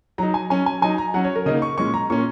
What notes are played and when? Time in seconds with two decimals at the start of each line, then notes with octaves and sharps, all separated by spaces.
0.18 F#3 D#4 A#5
0.34 G#5
0.50 F#3 C#4 G#5
0.66 G#5
0.82 F#3 D#4 G#5
0.98 A#5
1.14 F#3 C#4 F#5
1.25 C#5
1.36 A#4
1.46 C#3 A#3 D#4 D#5
1.62 C#6
1.77 A#2 G#3 C#4 C#6
1.94 A#5
2.10 A#2 A#3 C#4 C#6